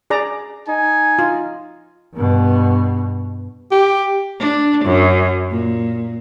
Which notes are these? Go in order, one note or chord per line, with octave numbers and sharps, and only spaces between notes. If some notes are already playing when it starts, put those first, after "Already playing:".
G#4 D5 A#5
D#4 G#5
F4
G2 B2
G4
D4
F#2
A#2